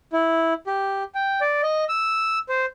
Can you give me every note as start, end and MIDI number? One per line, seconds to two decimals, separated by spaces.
0.13 0.54 64
0.67 1.03 67
1.15 1.40 79
1.41 1.61 74
1.63 1.84 75
1.89 2.39 88
2.49 2.66 72